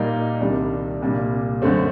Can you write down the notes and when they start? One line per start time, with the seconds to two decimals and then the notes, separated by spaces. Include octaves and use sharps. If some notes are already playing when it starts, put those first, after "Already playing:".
Already playing: A#2 G3 A#3 D#4
0.41 C2 C3 D#3 G3 D4
1.01 C2 A#2 G3 D4
1.62 F#2 D3 A3 C4